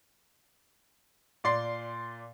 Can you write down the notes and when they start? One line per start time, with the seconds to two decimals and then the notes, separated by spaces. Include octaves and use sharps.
1.44 A#2 D5 C6 C7